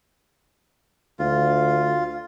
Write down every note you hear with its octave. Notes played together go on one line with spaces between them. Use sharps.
D2 F4